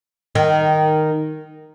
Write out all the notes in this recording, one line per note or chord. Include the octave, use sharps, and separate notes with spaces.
D#3